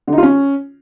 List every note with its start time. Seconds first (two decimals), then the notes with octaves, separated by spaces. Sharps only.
0.08 D3
0.13 D#4
0.18 F4
0.23 C#4